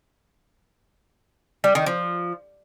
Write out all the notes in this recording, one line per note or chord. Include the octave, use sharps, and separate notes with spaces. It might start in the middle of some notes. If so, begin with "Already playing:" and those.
G3
D#3
F3